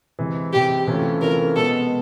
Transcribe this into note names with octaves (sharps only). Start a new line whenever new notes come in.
C3 E3 G#3
C3 E3 G#3 G4
C3 E3 A3 C#4 F4
C3 E3 A3 C#4 F4 A#4
B2 G#3 B3 A4